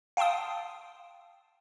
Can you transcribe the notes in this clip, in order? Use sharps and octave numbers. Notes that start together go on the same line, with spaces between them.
F5 G5 A5 C6 D#6